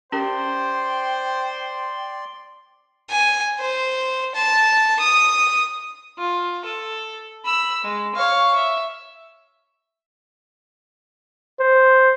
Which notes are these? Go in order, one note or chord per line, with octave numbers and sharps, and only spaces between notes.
C#4 G4 A#4 C5 D5 G5 C6
G#5
C5
A5
D#6
F4
A4
B5 E6
G#3
C#5 F5
E5
C5